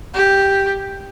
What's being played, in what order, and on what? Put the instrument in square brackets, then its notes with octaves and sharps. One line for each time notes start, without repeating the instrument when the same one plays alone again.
[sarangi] G4